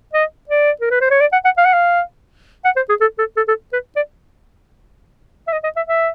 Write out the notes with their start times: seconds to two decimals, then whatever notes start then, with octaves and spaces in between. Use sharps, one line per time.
0.13 D#5
0.49 D5
0.81 A#4
0.91 B4
1.01 C5
1.11 C#5
1.21 D5
1.33 F#5
1.45 F#5
1.58 F5
1.66 F#5
1.74 F5
2.65 F#5
2.77 C5
2.89 G#4
3.01 A4
3.19 A4
3.37 A4
3.48 A4
3.73 B4
3.96 D5
5.48 E5
5.53 D#5
5.64 D#5
5.77 E5
5.88 E5